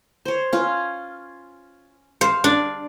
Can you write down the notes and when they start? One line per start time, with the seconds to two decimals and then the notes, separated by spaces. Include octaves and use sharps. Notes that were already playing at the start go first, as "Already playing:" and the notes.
0.25 C5 C#5
0.53 C#4 F4
2.21 C5 F5
2.44 D4 D5